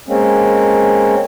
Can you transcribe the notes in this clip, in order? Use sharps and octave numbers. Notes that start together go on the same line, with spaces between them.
G#3 A#3 C4 C#4